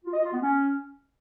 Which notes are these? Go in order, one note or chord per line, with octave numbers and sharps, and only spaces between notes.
F4
D#5
F4
B3
C#4